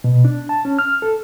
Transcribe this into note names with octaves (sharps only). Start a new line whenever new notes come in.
B2
D4
A5
C#4
F6
A4